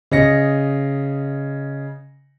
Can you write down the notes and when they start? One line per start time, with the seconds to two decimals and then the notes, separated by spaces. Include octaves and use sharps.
0.11 C#3 D#5 A#6 C#7